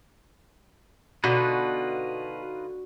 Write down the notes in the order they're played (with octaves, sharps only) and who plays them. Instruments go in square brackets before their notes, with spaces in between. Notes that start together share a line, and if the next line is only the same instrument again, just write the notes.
[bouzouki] B2 [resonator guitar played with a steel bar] D3 [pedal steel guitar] D#4 F4 B4 [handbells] F#4